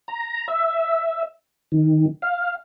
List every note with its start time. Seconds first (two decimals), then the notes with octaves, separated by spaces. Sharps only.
0.08 A#5
0.48 E5
1.72 D#3
2.22 F5